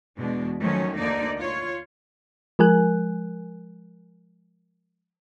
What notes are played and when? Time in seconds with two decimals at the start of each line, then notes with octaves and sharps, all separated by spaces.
0.17 E2 B2 G#3 D4
0.60 D#3 F3 F#3 A3 C#4
0.96 D2 D3 A#3 D#4 D5
1.39 F4 C#5
2.59 F3 G#3 A#4 G#5 F#6